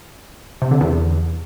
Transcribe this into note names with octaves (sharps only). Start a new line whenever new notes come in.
C3
D3
E2